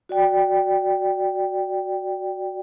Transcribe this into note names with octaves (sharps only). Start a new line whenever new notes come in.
F#4 D5 G5